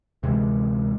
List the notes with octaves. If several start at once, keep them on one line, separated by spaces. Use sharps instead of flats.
D2 C3 E3 G#3